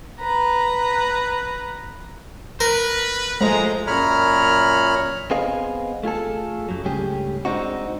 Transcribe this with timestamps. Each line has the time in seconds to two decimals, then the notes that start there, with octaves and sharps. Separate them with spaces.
0.20 B4 A#5
2.60 A#4 B4
3.41 F3 G#3 A3 A#5
3.87 F#2 A#2 C#5 A#5 B5 F6
5.31 B3 C4 G#4 D#5 F5
6.03 A3 F4 G#4 A4
6.68 F#2 F#3
6.85 C#2 G2 A3 C#4 G4 G#4
7.45 G#3 C4 D4 D#4 F#4